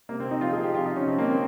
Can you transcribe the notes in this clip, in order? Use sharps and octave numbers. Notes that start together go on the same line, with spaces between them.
C3 A#3
C4
C3
D#4
F3 F4
G#4
F3
G4
C3 F4
D#4
C3
C#4
F3 C4
A#3
F3
C4